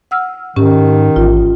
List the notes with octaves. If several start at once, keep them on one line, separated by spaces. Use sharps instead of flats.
F#5 E6 F6
G#2 D#3 C#4 G4
A1 F4